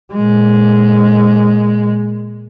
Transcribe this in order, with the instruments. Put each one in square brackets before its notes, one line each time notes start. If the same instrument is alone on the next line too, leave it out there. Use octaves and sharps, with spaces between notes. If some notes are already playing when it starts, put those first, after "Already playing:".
[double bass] A#2 G#3